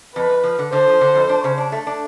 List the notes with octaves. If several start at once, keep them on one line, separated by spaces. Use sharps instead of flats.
F2 B4
F2
F3
D3
D3 C5
F3
D3
F2
D4
C#3
D4
A3
D4